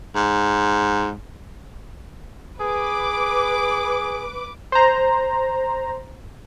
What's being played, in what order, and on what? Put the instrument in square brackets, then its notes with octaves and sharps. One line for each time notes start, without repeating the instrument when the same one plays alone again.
[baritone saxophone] G#2
[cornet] G#4 [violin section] B4 D6
[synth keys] C5 A#5